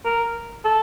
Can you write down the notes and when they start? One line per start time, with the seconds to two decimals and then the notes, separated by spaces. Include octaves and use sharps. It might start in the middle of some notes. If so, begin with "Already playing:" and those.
0.05 A#4
0.65 A4